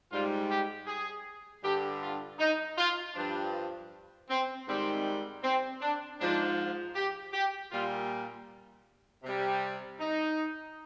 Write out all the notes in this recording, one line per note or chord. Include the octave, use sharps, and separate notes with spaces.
G#2 G3 F4
G4
G#4
G2 D3 G3 G4
F4
D#4
F4
G2 F3 D4
C4
G#2 D#3 G3 C4
C4
D4
G#2 F3 D4
G4
G4
A#2 G3 F4
C3 G3
D#4